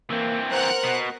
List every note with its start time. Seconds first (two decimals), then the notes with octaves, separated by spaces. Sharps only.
0.10 E3 A#3 C4
0.52 A#4 C5 F#5 F#6
0.84 B2